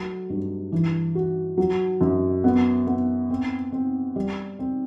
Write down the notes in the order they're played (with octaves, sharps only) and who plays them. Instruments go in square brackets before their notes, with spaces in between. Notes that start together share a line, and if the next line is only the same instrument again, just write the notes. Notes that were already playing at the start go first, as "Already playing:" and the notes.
Already playing: [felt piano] F#3 A3
G2
E3
F#4
F#3
F#2
B3
B3
C4
C4
G3
C4